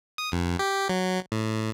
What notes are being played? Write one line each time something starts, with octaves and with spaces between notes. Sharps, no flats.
D#6
F2
G4
F#3
A2